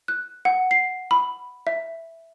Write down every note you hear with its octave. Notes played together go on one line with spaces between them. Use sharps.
F#6
F#5
C7
B5
E5